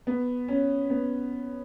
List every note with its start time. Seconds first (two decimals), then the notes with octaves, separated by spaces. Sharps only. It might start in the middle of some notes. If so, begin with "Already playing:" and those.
0.07 B3
0.48 C#4
0.90 B3